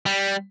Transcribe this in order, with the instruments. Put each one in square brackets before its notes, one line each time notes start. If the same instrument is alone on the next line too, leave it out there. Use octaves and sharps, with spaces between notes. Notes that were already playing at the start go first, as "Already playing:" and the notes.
[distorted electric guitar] G3